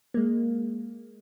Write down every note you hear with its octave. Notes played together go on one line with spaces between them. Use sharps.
G#3 A#3